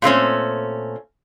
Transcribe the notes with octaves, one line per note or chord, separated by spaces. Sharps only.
A#2 A3 C4 C#4